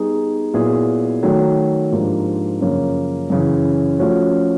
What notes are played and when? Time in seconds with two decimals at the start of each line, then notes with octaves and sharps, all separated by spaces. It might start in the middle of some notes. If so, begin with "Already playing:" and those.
Already playing: G3 B3 D#4 G#4
0.54 A#2 F#3 B3 E4 G#4
1.23 D#3 F#3 A3
1.92 G#2 F3 A#3 D4 G4
2.61 F#2 C#3 F3 A#3 C#4
3.30 F#2 C#3 E3
3.99 F3 A3 C#4 F#4